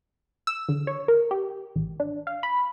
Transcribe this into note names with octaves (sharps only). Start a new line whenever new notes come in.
E6
D3
C#5
A#4
G4
A1
D4
F5
B5